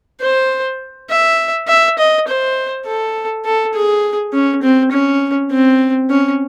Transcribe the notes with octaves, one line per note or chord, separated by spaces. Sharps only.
C5
E5
E5
D#5
C5
A4
A4
G#4
C#4
C4
C#4
C4
C#4